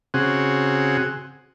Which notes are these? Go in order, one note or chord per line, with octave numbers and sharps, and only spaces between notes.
C#3 C4 F#4 G#4